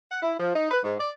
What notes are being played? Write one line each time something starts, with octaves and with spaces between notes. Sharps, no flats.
F#5
E4
F3
D#4
B4
G#2
D5